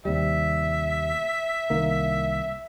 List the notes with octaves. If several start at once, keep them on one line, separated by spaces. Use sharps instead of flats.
D#2 C3 G3 E5
C2 D#3 A#3